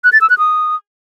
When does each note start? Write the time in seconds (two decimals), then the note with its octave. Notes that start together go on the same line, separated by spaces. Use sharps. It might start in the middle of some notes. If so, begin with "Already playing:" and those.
0.04 F#6
0.13 A6
0.21 E6
0.30 F#6
0.38 D#6